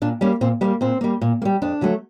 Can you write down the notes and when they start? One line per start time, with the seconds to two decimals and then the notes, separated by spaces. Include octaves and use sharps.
0.02 A#2 D4
0.21 G3 A#3 C#4
0.41 A#2 C4
0.61 G3 B3
0.64 A#3
0.81 A#2 C4
1.01 G3 A#3
1.21 A#2
1.42 A#3
1.45 G3
1.62 F2 D4
1.81 D3 F#3 A3